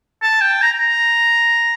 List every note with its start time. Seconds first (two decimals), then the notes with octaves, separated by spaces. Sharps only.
0.23 A5
0.41 G5
0.62 A#5
0.78 A#5